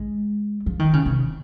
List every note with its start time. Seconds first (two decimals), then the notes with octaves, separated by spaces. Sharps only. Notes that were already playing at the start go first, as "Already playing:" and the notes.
Already playing: G#3
0.66 F3
0.79 D#3
0.93 C#3
1.06 C3